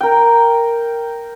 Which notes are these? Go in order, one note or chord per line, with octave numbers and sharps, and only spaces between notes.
A#4 G5